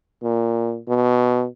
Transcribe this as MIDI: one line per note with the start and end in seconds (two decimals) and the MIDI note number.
0.23 0.79 46
0.88 1.46 47